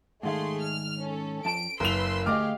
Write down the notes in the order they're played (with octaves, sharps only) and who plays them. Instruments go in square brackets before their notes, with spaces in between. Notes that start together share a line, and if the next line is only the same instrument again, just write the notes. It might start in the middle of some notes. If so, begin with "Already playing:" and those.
[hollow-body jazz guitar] G#2 D#3 F5 [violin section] A3 G#4 C6
[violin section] F6
C#4 A4
[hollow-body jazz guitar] F2 A5 [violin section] D7
[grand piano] F#1 F7 [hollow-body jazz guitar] A#4 [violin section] B4 C6 E6
[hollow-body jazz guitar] D2 A3 D#5 [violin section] G4 G#4 F5 [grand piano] D6 F6